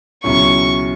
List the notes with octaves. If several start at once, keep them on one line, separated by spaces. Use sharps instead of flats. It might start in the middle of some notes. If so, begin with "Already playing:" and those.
C#2 B2 F#3 C#4 E4 C#6